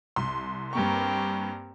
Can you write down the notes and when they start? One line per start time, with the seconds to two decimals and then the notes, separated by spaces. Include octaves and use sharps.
0.16 C2 C6
0.73 G2 A#3 C4 G4 A#4 C#6